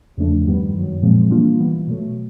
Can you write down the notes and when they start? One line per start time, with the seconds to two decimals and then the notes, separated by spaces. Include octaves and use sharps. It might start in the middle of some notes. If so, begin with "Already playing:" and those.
0.17 E2 C#3 F3 A3 D4
0.46 G2 D#3 G3 B3
0.74 F#2 D#3 F#3
1.02 A#2 F3 G#3 C4
1.30 E3 G3 A#3 D4 F4
1.59 E3 G3 B3
1.87 B2 F#3 A3